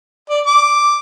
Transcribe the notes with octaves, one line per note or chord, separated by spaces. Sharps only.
D5
D6